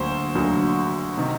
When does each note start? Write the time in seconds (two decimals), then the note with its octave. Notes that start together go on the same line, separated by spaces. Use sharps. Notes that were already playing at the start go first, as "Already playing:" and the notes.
Already playing: D2 D3 F#3 A#3 C5
0.35 D2 D3 F#3 A#3
1.18 C3 D#3